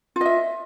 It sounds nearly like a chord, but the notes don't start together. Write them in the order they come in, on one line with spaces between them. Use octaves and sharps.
F4 D#5 E5